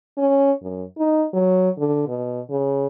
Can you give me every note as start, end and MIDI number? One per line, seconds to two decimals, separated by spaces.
0.18 0.52 61
0.62 0.84 42
0.98 1.25 63
1.33 1.70 54
1.78 2.03 50
2.08 2.41 47
2.50 2.87 49